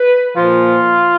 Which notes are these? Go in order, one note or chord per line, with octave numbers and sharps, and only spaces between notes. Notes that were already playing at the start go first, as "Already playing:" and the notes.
Already playing: B4
A#2 F3 F4